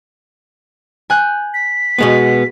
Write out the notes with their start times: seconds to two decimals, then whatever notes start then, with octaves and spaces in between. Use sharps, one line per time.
1.10 G#5 F#6 G6
1.54 B6
1.98 B2 G#3 B3